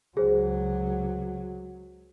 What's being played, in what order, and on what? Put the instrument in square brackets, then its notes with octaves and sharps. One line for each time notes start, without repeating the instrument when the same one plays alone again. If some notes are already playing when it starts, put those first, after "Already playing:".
[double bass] C#2 F#3 [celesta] G#4 C5